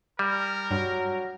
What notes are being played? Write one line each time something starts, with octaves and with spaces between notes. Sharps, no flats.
G3 A#4
G2 F#3